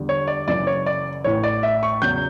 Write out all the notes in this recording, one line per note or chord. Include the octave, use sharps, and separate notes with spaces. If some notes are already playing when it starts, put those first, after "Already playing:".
Already playing: E2 D3 G3
C#5
D5
F#1 F#2 C#3 E3 D5
C#5
D5
A1 A2 E3 C#5
D5
E5
C#6
E2 C#3 F#3 G6